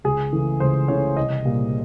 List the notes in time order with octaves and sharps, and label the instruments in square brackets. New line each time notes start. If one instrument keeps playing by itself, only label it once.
[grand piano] C#2 G#4
C#3 E3 A3
C#2 C5
C#3 E3 A3 C#5
C2 D#5
A#2 G3 A#3